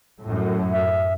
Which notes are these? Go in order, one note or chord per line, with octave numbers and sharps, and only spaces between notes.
F#2 A2
E5